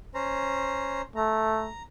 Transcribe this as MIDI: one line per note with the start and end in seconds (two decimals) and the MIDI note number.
0.14 1.01 61
0.14 1.01 72
0.14 1.01 82
1.16 1.70 57
1.16 1.83 82